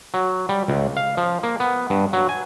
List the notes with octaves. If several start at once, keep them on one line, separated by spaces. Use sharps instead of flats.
F#3
G3
C#2
F5
F3
A#3
B3
G2
F#3
G#5